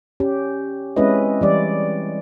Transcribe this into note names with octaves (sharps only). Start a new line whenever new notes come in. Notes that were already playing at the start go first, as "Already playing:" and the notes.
C#4 G4
G#3 C4 C#4 E4 B4 D#5
E3 G3 D5